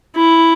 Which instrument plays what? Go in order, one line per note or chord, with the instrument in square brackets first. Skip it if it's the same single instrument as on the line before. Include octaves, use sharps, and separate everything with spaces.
[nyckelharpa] E4